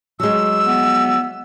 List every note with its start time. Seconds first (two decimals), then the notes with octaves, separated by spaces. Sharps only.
0.20 F#3 G#3 E6
0.66 B3